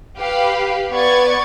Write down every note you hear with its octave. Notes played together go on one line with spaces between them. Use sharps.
G4 B4 F5
B3 D5 C#6 G#6 A6